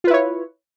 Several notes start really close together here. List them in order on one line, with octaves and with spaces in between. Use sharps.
F4 B4 E4 C#5